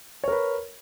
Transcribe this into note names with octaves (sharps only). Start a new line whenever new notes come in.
A#4 B4 C#5